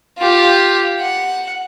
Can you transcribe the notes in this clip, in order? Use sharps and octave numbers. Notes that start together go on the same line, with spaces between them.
F4 G4
F#5